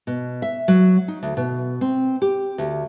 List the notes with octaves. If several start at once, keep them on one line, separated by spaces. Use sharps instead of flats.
B2
E5
F#3
D#4
D2
B2
C4
G4
D2